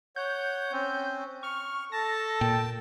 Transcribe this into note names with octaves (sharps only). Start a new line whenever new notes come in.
C#5 F#5 G6
C4 C#4
C#6 F6
A4 A5 A#6
A#2 G5